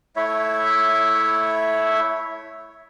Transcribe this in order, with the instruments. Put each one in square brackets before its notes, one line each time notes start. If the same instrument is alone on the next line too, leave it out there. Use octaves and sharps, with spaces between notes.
[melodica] A3 E4 C#5 E5